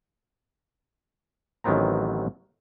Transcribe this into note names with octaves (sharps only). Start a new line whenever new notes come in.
A1 D#3 F#3 B3 C4 A#5